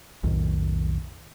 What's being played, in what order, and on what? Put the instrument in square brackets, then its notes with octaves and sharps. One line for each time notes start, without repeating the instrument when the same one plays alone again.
[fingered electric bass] B1 F2 A2 D#3